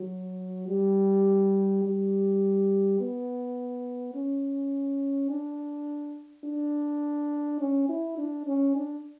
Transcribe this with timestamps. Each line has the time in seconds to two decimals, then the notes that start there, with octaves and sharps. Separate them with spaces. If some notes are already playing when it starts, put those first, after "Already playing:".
Already playing: F#3
0.69 G3
1.85 G3
3.00 B3
4.15 C#4
5.30 D4
6.44 D4
7.60 C#4
7.89 E4
8.18 D4
8.46 C#4
8.75 D4